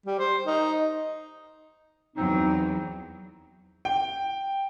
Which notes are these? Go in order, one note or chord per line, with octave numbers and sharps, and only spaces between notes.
G3
C5
D#4
E2 F#3 C4 D#4
G5